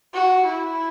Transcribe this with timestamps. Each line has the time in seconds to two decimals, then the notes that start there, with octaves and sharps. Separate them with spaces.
0.14 F#4
0.46 E4